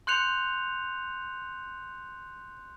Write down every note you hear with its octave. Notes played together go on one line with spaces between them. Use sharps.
C6 F#6 G6 C#7 F7